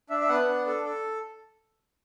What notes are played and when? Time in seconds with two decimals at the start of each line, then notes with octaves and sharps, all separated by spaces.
0.10 D4 E5
0.21 E5
0.29 B3 F#5
0.48 D4
0.67 A4
0.85 A4